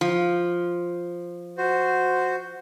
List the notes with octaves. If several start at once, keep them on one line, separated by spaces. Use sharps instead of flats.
F3
F#4 C5